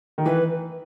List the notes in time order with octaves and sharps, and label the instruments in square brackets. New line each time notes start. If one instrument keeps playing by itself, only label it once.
[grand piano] D#3
[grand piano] E3 [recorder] B4